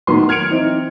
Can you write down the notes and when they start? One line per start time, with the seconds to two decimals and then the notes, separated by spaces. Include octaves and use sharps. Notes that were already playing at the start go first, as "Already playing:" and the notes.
0.07 A2 D#3 F#3 B3 B4 C6
0.29 F6 G#6 C#7 D7 F7
0.50 E3 C4 D#4